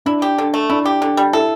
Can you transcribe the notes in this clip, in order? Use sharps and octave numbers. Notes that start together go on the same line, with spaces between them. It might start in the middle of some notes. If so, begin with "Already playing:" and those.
D4 E4
G4
D3
A3
D4 E4
G4
D3
G3
E4 A4